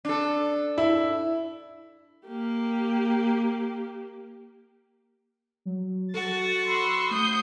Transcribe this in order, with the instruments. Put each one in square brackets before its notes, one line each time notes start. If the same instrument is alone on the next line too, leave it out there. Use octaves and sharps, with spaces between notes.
[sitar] D4 A4
[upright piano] E4
[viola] A#3 G4
[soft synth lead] F#3
[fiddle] F#4 [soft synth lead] A4 [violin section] A6
[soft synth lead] B5 [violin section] C6 E6 C#7
[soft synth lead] A3 [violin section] D#6 G6 C7